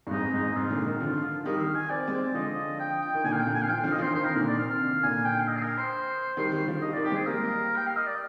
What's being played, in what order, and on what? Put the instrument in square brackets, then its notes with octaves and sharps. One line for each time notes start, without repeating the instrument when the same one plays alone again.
[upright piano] G2
[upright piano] F2 G#2 [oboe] D#4
[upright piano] F2 G#2 [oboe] D#4
[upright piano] G#2 C3 [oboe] F4
[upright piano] A#2 D3
C3 D#3
D3 F3
[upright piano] D#3 G3 [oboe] D#5
[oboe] F5
G#5
[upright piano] C4 [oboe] D5
[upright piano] G#3 C4
[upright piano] D3 F3 [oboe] D#5
[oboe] G5
G5
[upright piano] D#3
[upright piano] A#2 D3 [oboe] G#5
[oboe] F5
G5
[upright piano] A#2 D3
[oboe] G#5
F5
[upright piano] D3 F3 [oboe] G5
[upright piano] D3 F3 [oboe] F5
[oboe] D#5
[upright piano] D3 F3 [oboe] C5
[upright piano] C3 D#3 [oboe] C5
[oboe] A#4
[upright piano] A#2 D3
[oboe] D5
[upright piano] C3 D#3 [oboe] F5
[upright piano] A#2 D3 [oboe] G#5
[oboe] G5
F5
D#5
G#4
A#4
C5
[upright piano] D#3 G3
D#3 G3
D3 F3
[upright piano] D#3 G3 [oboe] D#5
[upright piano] D#3 G3 [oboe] D5
[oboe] G4
[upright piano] G#3 C4 [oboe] G#4
[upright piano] G3 A#3 [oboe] A#4
[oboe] G5
F5
D#5
D5